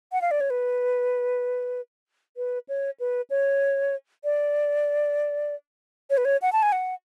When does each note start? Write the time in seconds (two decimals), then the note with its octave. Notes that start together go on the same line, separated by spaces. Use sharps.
0.12 F#5
0.21 F5
0.31 D5
0.41 C#5
0.50 B4
2.37 B4
2.69 C#5
3.00 B4
3.30 C#5
4.24 D5
6.10 C#5
6.17 B4
6.25 C#5
6.42 F#5
6.53 A5
6.63 G#5
6.72 F#5